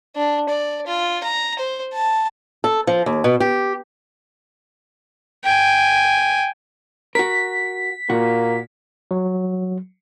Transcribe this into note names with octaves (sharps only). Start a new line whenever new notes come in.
D4
D5
F4
A#5
C5
A5
A4
F3
D#2
B2
G4
G5 G#5
F#4 A#4 B6
A#2 A#3 F#4
F#3